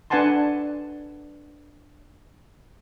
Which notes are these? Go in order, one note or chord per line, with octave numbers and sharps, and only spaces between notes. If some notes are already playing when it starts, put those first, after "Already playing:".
D4 B4 F#5 G#5 A5 C6